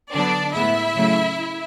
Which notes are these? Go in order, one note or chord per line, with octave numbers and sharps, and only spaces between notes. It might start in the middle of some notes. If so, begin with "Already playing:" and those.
D3 F#3 B3 D4 D5
A2 G#3 B3 E4 E5
C#3 F#3 A3